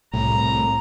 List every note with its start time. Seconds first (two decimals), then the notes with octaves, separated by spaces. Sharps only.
0.14 C2 A2 A#5